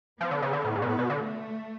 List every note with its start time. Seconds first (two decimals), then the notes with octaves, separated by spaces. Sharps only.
0.20 F3 B3
0.31 D3
0.42 C#3
0.53 D3
0.64 A2
0.75 G#2
0.82 B2
0.86 A2 B3
0.99 B2
1.10 D3
1.20 A3